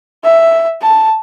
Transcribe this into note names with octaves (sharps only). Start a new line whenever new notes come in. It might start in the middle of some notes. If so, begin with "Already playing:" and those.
E5
A5